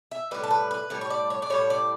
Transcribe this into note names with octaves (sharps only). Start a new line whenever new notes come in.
E5
A2 G3 B4
A4
B4
B4
A2 G3 C#5
C#5
D5
C#5
D5
A2 G3 C#5
D5